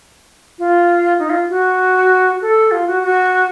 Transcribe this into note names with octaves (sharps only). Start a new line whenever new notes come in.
F4
D#4
F4
F#4
A4
F4
F#4
F#4